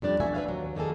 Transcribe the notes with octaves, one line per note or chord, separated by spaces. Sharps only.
F2 G3 D4 D5
E2 B2 A3 F#4 E5 G#5
D4 B4 C5 E5 F5
D#2 F#3
F2 D#3 A#3 G#4 A4